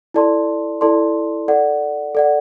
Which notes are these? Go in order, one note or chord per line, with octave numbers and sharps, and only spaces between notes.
E4 A4 D5 A5 C6
E4 A4 D5 A5 C6
A4 D5 F#5
A4 D5 F#5